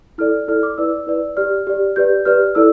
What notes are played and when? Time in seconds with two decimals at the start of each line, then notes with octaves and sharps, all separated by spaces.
0.18 E4 A4 D5 F6
0.48 E4 A4 D5 F6
0.63 D6
0.78 E4 B4 D5 E6
1.07 E4 B4 D5
1.37 G4 D5 F6
1.67 G4 D5
1.96 G4 B4 D5 G6
2.25 G4 B4 D5 F6
2.55 E4 A4 D5 E6